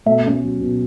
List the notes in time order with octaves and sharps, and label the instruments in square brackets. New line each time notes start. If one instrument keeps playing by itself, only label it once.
[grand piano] B2 [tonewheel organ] A3
[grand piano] C#4
F#3
B2